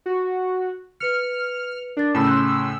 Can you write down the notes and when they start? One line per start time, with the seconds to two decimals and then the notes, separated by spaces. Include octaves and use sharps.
0.06 F#4
1.00 B4 F6 C#7
1.97 D4 A#4 A6
2.15 A2 C#3 A5 B5 E6
2.27 C6 F#6 G6